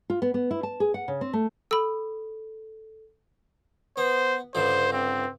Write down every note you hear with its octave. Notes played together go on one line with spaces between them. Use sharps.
F4
B3
B3
E4
A5
G#4
F#5
C#3
C4
A3
A4 B5 E6
B3 C5
C#2 G2 D3 C5
C4